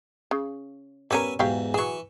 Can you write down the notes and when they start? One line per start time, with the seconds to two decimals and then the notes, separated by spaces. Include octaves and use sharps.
0.31 C#3
1.11 G3 B3 C#4 A#4 E5 G#5
1.39 E2 G#2 F#3 G4 F5
1.74 E3 F#3 G#4 C#6